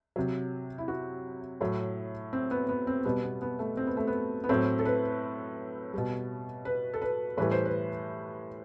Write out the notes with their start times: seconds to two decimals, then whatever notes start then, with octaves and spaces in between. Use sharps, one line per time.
0.16 C3 F#3
0.78 E4
0.88 F#4
1.61 A2 F#3
2.33 C4
2.51 B3
2.69 B3
2.87 C4
3.05 B2 G3 B3
3.23 B3
3.42 B3
3.59 A3
3.77 C4
3.87 B3
3.97 A3
4.07 B3
4.44 B3
4.49 A2 F#3 C4
4.79 A4
4.85 B4
5.93 B2 G3
6.65 B4
6.94 A4
7.02 B4
7.37 A2 E3 G3 B4
7.51 C5
7.65 B4